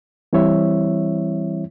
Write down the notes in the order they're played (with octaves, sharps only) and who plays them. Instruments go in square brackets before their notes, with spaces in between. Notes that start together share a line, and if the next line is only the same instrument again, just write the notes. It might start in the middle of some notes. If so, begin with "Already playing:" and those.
[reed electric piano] E3 G3 C4 E4 C#5 E5